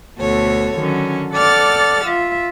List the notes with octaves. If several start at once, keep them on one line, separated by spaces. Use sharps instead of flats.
D2 B2 F#4 A4 C#5
D3 D#3 F#3 C#4
A4 D5 F#5 D6 F6 A6
F4 E5